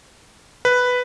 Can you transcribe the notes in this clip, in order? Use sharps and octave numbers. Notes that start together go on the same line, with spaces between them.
B4